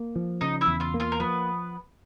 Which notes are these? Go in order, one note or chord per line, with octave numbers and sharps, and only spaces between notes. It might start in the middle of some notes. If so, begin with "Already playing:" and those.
Already playing: A#3
F3
C#3 D#4 D#5
E4 E5
E2
F4 F5
A#3
F4 F5
A#4
F3 B3 B4